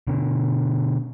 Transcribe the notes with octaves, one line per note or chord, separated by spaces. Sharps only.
B2 D3